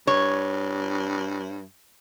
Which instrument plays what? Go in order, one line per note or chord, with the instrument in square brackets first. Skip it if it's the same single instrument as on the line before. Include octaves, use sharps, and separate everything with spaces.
[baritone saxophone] G2 [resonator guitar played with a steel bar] C#5